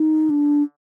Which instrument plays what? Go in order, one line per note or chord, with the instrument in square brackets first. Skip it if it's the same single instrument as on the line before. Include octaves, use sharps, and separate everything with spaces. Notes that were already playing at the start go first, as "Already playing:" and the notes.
Already playing: [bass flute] D#4
D4